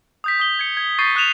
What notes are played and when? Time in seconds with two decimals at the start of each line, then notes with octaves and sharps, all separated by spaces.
0.24 D#6 G6 B6
0.40 D#6 G7
0.59 G#6 C#7
0.77 G#6 G7
0.99 C#6 G6 A6 B6 C7 D#7
1.15 D#6 F#6 B6 E7 F7